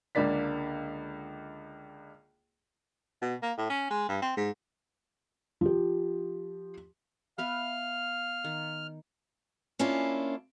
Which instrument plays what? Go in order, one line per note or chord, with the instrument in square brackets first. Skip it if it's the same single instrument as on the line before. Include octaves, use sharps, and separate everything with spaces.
[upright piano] C#2 D3 A#3 D5 B6
[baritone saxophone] B2
A#3
A2
C#4
G#3
G2
C4
G#2
[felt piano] F3 G4
[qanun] B3 B4 E5 [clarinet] F5 [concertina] F6
[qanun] D#3
[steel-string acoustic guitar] A#3 C#4 D4 E4 F4